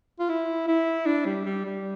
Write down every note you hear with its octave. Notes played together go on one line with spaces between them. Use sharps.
F4
E4
E4
D4
G3
G3
G3